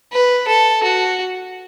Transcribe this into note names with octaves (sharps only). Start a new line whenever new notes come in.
B4
A4
F#4